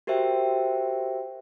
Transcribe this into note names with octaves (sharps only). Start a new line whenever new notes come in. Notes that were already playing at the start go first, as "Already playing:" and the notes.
F#4 G4 A#4 C5 E5 G5